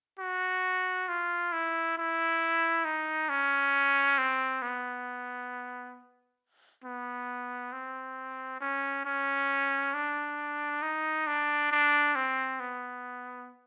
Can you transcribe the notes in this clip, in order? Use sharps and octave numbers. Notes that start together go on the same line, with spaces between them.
F#4
F4
E4
E4
D#4
C#4
C4
B3
B3
C4
C#4
C#4
D4
D#4
D4
D4
C4
B3